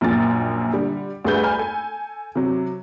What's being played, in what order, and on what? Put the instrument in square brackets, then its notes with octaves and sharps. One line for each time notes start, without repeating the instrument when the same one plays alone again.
[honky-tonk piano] A#1 F#2 A#2 A6
D3 G3
D2 G3 A3 G#4 B4 G6
G5 G#5 A#5 B5 F6
A4 G#5
C3 F#3